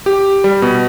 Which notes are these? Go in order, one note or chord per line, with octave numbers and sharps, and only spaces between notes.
G4
G3
B2